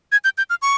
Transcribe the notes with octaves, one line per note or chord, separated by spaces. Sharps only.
G#6
G6
G6
F6
C#6